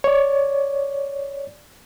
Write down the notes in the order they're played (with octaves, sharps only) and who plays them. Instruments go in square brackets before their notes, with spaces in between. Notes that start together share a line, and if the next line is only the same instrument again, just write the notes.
[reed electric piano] C#5 D5